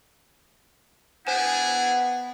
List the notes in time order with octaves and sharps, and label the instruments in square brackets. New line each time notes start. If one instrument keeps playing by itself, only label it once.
[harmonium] B3 [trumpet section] D4 E4 G#4 [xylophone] C5 G#5 E7 [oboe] F#5